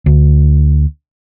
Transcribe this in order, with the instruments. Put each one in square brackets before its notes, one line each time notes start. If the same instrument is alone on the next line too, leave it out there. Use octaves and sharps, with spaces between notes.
[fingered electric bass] D2